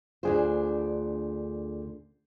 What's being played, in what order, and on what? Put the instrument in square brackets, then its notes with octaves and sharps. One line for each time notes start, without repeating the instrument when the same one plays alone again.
[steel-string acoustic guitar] D2 D4 C5 [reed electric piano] F4 G#4